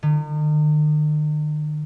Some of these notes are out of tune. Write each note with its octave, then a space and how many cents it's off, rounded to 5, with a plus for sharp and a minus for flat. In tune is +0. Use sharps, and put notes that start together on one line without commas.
D#3 -45